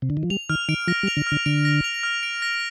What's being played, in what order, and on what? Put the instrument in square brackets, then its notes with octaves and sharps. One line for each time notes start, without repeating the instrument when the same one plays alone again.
[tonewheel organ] C3
D3
D#3
F3
[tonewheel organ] G3 [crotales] F7
[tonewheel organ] D#3 [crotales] F6
[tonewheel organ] D#3 [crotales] D7
[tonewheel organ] F3 [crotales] A#6
[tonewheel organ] G3
[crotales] F7
[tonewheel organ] D3
[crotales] F6
[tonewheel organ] D3
[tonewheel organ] D3 [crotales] D7
[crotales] A#6
F7
F6
D7
A#6